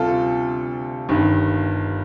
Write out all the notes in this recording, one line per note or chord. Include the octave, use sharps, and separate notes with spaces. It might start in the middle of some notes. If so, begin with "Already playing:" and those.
Already playing: D2 C3 G3 F4 A4
G1 G2 D#3